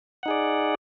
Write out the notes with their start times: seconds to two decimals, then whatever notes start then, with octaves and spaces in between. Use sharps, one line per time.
0.23 F#5
0.26 D#4
0.28 G#4
0.31 D5